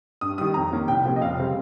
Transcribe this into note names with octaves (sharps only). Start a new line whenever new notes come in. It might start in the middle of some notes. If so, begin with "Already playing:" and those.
G2 D#6
D#3 G3 D#6
F2 A#5
D#3 A#3 C#4
C2 G5
C3 F3 A#3 C#4
D#5
F1 F5
C#3 G3 C4